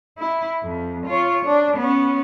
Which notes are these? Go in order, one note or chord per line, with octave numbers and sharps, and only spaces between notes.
E4
F2
F4 C#5
D4
B3 C#4